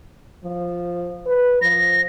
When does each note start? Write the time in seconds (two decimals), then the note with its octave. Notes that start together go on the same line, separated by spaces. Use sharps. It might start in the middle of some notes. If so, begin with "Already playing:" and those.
0.44 F3
1.26 B4
1.62 F3 A#6